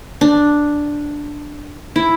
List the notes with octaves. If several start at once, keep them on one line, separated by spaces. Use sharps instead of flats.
D4
E4